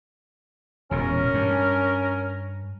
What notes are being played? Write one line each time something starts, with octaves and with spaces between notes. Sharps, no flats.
E1 A#2 C#4 A#4
G2